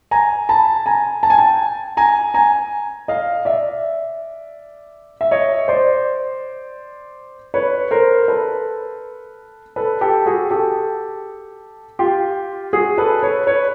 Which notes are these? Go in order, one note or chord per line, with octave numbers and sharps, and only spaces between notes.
G#5 A#5
A5 B5
G#5 A#5
A5
G#5
G5 A5
G#5 A#5
G#5 A#5
D#5 F5
D5 E5
E5
C#5 D#5
C5 D5
B4 C#5
A#4 C5
A4 B4
A4 B4
G4 A4
F#4 G#4
G4 A4
F4 G4
F#4 G#4
A4 B4
B4 C#5
B4 C#5